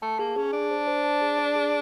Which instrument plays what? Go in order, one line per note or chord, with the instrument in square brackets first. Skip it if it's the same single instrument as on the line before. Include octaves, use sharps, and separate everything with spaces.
[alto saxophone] A3 [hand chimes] A5
[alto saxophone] A#3 [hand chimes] G#4
[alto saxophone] C#4 [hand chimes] G#4
[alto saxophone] D4 [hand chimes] A5
[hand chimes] C5
C5
A5
G#4
D5
G#4